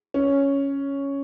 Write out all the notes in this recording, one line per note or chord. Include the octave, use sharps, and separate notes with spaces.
C#4